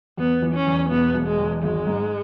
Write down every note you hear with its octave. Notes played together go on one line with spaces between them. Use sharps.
E2 B3
E3
C#4
E2
E1 B3
E1
G#3
E2
G#1 G#3
G#2